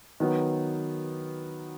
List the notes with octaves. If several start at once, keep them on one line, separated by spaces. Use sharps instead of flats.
D#3 F#3 B3